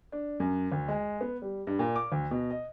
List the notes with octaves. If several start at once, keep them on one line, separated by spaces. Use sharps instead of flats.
D4
F#2
D2
G#3
B3
G3
G2
A#2
D6
D2
B2
D#5